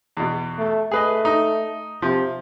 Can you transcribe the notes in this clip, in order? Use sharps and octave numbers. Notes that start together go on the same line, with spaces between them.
E2 B2
A3
A3 G#4 B4 D#5
D#4
C3 F3